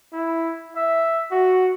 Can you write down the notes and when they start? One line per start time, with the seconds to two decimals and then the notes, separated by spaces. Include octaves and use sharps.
0.12 E4
0.76 E5
1.31 F#4